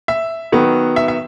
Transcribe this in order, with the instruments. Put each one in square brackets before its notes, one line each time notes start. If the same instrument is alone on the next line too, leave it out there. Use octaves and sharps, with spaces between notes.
[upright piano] E5
D#3 F#3 B3
E5
E5